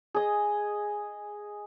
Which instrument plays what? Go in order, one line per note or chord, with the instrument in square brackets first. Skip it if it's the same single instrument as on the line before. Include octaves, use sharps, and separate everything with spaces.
[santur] G#4 D#5